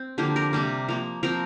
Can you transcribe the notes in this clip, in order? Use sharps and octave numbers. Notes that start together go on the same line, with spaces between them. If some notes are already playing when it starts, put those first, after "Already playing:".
Already playing: C4
D3 F3 A#3 G4
A#4
C3 G3 A#3
F3 A#3
F3 C4 A#4